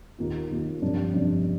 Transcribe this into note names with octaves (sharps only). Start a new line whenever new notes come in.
D#2 D#3 A#3 F4
D#2 D#3 A#3 F4
G1 F2 C3 G3 D4
G1 F2 C3 G3 D4